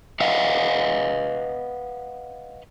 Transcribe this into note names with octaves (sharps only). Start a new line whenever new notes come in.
B4 D#5 F5 F#5